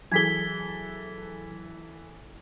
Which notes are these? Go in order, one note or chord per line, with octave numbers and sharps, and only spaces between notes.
E3 F#3 G#4 A4 G#6 B6 G7